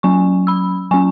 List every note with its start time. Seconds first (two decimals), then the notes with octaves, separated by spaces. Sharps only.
0.03 F#3 C#4 G#5 C#6
0.47 B5 E6
0.91 F#3 C#4 G#5 C#6